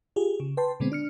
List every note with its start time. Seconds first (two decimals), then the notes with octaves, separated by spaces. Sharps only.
0.16 F4 G4 G#4
0.40 C#3
0.57 B4 G5 A5 C6
0.80 B2 D3 G#3 B3 C4
0.92 D4 F6 C#7